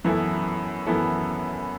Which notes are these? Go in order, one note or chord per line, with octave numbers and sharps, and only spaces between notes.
F#2 E3 B3 E4 A4
F#2 E3 B3 E4 A4